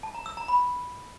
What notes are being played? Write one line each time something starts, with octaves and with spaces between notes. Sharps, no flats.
A5
A#5
E6
A#5
B5